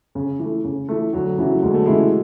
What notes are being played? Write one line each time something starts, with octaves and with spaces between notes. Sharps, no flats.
C#3
E3
A3
C#3
E3 A3
D2 F#3
C#3 E3 F#3 A3 E4
D2 G#3
A3
C#3 E3 G#3 A3 E4